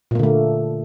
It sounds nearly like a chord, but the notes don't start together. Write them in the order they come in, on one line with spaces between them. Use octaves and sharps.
A#2 A#3 D3 A3